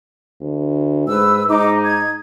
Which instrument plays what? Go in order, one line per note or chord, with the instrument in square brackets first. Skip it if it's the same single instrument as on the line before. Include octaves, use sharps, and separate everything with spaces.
[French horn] D2
[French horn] G#2 [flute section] B4 E6
[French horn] G#2 [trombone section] D#4 [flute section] D6
[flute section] G#6